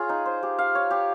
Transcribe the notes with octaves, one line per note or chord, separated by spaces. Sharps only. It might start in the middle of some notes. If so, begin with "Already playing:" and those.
Already playing: F4 G#4 C#5
D#4
C5
G4
F5
C#5
G4